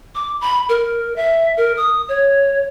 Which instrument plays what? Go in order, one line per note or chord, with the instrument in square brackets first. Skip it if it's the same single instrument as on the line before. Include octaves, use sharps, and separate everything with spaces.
[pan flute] D6
B5
A#4
E5
A#4
D#6
C#5